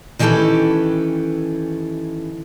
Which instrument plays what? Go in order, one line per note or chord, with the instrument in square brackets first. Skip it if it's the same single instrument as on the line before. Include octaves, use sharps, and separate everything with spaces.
[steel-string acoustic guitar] D#3 E3 C#4 G4 A4 B4